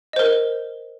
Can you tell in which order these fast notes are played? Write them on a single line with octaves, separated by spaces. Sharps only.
D#5 C5 A#4